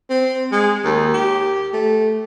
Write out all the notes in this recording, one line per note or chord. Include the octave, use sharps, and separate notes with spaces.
C4
G#3
D#2
G4
A3